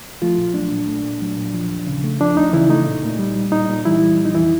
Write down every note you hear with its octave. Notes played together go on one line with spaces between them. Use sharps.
F3 A3 F4
A#2
F#3 D4
A#2
A3
A#2
F#3
A#2
F3
D#2
C#3
A3
F3 D4
D#2 D#4
C#3 E3 E4
A3 D#4
A#2
A#2
G3
G3
A#2 D#4
A#2
E3 G3 E4
G3
F3
D#4
F2 E3 E4